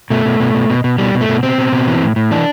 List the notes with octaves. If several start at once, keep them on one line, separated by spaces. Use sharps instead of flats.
B2 A3
B2
B2
B2
B2
B2
B2 G3
B2
A3
B2
B2 C4
B2
B2
E3
A2
A2
E3 D4